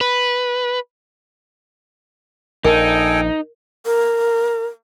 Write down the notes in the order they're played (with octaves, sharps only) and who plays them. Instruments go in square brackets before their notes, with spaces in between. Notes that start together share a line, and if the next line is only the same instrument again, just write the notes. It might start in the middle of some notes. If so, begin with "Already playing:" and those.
[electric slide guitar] B4
[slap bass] A#1 [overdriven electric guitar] D#4 [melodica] A4 G5 G#5 [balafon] A#4
[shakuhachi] A#4